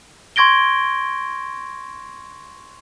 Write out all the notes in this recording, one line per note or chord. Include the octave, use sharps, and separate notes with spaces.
C6 C#6 G#6 A#6 D7 G7